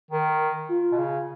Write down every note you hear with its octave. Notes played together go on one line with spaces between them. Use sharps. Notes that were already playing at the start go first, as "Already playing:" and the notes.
D#3 A#4
F4
B2
C#3